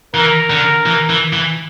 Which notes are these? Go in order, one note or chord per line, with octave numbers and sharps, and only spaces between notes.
E3 A#4
D3
E3
E3
E3